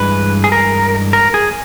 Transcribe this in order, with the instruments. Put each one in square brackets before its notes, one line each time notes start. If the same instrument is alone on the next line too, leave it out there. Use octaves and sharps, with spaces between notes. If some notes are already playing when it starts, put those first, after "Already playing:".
Already playing: [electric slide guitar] G2 E3 G#3 B4
G#4
A#4
A#4
G#4